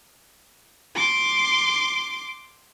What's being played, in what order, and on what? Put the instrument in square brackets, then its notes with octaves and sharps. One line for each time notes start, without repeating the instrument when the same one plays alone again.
[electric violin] C6 D6